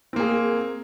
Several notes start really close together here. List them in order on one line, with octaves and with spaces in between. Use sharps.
C4 A#3 G#4